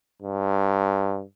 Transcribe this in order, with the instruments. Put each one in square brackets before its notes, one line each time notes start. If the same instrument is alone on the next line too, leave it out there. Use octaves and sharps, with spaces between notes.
[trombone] G2